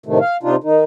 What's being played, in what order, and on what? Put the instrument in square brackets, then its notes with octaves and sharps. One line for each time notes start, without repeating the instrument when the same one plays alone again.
[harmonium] A2 C3 D#3 A3
F5
C3 D4 D#4 F4
D#3 D#4